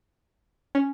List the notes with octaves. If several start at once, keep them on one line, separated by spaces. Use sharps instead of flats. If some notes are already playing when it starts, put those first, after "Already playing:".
C#4